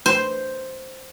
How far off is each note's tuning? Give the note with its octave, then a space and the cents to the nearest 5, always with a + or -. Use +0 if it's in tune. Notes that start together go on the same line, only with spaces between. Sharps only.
C5 +0